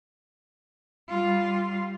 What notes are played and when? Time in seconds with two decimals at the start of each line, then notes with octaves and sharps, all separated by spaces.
1.10 G3 F4